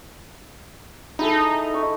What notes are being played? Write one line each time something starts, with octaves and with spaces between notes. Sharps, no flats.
D#4 E4 G#4 A4
C#6